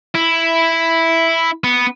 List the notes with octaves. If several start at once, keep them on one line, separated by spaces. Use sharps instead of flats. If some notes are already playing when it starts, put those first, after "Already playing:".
E4
B3